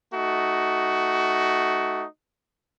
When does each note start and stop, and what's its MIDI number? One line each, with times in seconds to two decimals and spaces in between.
0.14 2.06 57
0.14 2.06 63
0.14 2.06 66